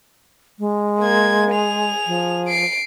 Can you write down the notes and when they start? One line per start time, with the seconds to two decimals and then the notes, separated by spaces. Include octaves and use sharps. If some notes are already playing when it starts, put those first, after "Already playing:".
0.59 G#3
1.00 A#3 G#6
1.52 G#4 F7
2.07 F3
2.48 C7 D7